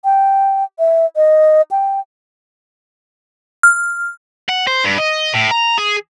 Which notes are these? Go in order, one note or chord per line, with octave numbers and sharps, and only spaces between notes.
G5
E5
D#5
G5
F6
F#5
C5
G2
D#5
A2
A#5
G#4